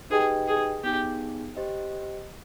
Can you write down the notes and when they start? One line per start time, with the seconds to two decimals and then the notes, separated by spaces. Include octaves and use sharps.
0.10 D#4 G4 G#4 B4 D#5 G5
0.48 G#4
0.84 B3 D#4 G4 G#4
1.57 G4 C5 D#5